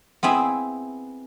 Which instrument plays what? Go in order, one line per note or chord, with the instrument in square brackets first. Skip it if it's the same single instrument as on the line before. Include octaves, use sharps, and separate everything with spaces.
[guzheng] B3 C4 E4 G#4